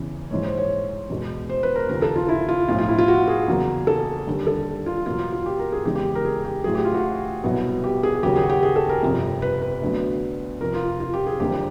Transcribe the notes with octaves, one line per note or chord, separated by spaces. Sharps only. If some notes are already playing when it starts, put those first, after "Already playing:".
Already playing: E2 C#3 E3
A#1 G#2 E3 C#5
C5
C#5
E2 B2 G#3
C5
B4
A#4
D#2 C#3 F3 A#4
A4
F4
E4
F4
B1 A2 F3 F4
F4
E4
F4
F#4
G#4
E2 C#3 F#3 A#3
A4
D#2 D3 G3
A4
F4
E2 B2 F#3 A#3 F4
F4
G4
A#4
G#4
E2 C#3 E3 G#3 G4
G4
A#4
G#4
G4
A1 A2 F#3 G#4
G4
F4
F#4
C2 B2 F#3 B3
G4
G#4
D#2 C#3 F#3 G4
G#4
F#4
G4
G#4
A4
A#4
G1 F2 C3
B4
B4
D2 D3 F#3 B3
F2 C3 F3 A#4
F4
F4
G4
G#4
F#1 F2 D3 G3 A#3 G4